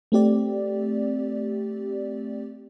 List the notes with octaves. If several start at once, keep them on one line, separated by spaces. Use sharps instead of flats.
A3 C4 G4 D5